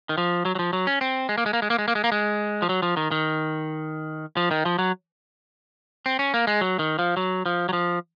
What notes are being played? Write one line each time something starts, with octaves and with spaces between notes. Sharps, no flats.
D#3
F3
F#3
F#3
F3
F#3
C#4
C4
G#3
A#3
G#3
A#3
G#3
A#3
G#3
A#3
G#3
A#3
G#3
F3
F#3
F3
D#3
D#3
F3
D#3
F3
F#3
C4
C#4
A#3
G#3
F#3
D#3
F3
F#3
F3
F#3
F3